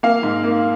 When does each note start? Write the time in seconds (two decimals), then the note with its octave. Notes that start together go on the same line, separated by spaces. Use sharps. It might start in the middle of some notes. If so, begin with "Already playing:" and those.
0.03 A#3 F5
0.23 G#2
0.44 A#3